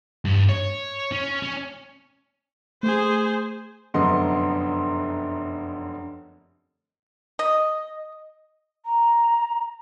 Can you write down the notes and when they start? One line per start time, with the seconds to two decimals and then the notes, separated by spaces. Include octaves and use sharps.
0.25 G2
0.49 C#5
1.12 C#4
1.43 C#4
2.83 A3 G#4 C5
3.94 F1 F#2 D3 B3 D#5 C6
7.39 D#5
8.85 A#5